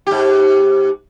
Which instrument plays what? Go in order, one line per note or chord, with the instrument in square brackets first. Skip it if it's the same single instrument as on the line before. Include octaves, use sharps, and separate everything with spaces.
[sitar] G#2 G4